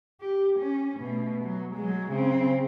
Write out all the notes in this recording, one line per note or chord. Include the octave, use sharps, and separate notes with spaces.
G4
C#4
B2 A3
F#3
F#3 G#3
C#3 C4